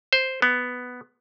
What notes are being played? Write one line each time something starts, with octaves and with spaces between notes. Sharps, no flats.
C5
B3